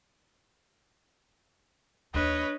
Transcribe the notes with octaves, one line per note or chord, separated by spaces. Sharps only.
D#2 E3 D4 B4 C#5 D#5